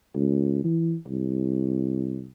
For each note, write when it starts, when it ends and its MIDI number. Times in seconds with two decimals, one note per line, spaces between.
0.15 0.63 37
0.64 0.95 52
1.08 2.27 36